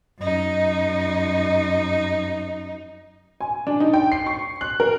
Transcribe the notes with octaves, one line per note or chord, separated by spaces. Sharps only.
F#2 D#4
G#5
D4
D#4
G5
C7
C#6
F#6
A#4